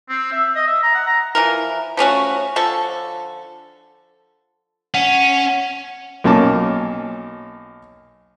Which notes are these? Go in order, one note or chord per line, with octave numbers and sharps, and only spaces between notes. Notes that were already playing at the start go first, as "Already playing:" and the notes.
C4
E5
D#5
E5
A#5
F#5
A#5
E3 F3 A#4
F3 A3 C#4 F#4
D3 F3 A4 C#6
C#4 F#5
B1 A#3 C#4 A5 D6